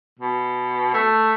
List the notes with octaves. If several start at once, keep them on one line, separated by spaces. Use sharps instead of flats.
B2
A3